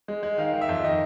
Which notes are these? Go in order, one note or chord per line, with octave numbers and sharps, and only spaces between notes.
G#3
G#3
D#3 F5
D#3
E5
F2
D#3 D#5